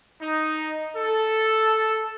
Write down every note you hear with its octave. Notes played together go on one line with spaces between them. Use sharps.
D#4
A4